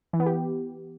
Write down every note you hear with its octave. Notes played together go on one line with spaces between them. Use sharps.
E3
B3
G4